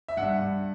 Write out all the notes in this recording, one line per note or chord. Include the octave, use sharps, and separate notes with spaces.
E5
G2 F#5
G2